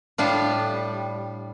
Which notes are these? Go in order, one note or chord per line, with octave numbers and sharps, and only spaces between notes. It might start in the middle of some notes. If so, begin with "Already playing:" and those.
A2 G3 D4 F4